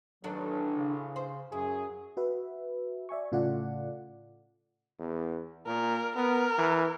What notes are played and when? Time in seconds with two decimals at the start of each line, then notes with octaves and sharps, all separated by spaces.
0.24 A1 D#3 F#3 D4 A4
0.74 C#3
1.16 C5
1.52 F#2 F#3 E4 G#4
2.17 F#4 B4 E5
3.09 D5 E5 G#5 C#6
3.32 A2 C#3 F4 A4 D5 F#5
4.99 E2
5.66 A#2 A#4
6.16 B3 A#4
6.58 E3